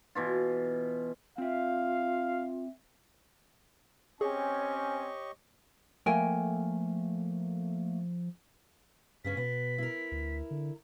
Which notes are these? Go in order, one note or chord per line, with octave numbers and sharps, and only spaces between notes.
B2 E3 F4
C4 F4 E5 F5
C4 C#4 G4 G#4 C#5 D#5 G#5 C#6
F3 A3 A#3 A#4 G5 G#5
G2 C#3 B3 C#4 B6
B2 B3
E4 A#4
D2
D3